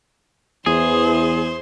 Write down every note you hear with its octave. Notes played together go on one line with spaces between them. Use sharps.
E2 E3 G#4 C5